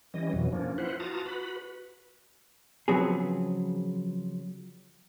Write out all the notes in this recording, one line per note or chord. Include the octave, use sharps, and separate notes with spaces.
E3 G3 C#4 D#5
F2 B2 E3 F#3
F3 A#3 C#4 D4
E4 F4 B4 C5 F#5
F4 F#4 A5 A#5 D#6
F#4 B4 B5
C#3 F3 F#3 B3 C4 G#4